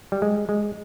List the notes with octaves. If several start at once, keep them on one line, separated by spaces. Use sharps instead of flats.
G3
G#3
G#3